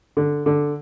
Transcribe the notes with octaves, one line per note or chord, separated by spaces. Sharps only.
D3
D3